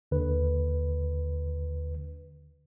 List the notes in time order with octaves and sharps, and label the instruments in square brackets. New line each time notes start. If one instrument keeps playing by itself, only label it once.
[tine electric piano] D#2 D3 B4